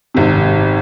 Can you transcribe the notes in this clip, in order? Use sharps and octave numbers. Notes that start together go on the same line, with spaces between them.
G#1 C3